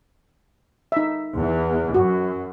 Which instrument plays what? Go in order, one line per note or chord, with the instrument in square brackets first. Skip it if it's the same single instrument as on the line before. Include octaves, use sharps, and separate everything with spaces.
[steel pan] D#4 E5
[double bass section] E2 E3
[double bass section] F#2 [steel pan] F#4